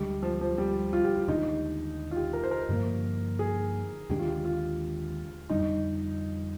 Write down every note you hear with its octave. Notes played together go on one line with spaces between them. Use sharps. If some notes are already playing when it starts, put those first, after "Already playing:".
Already playing: D2 D3 G3 G#3
F3
F3
G3
F4
G4
F4
D#2 D3 G#3 D4 D#4
F4
G4
A#4
C5
A#4
G2 D3 F3 A#3
G#4
D#2 D3 G#3 D4 G4
F4
G4
F4
F2 D3 G3 D4 D#4